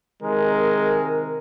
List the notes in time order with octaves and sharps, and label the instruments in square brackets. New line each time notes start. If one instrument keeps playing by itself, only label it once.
[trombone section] C3 D#3 A#4 [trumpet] G#3